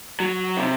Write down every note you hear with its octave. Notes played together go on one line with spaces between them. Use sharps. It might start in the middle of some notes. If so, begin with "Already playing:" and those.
F#3
C3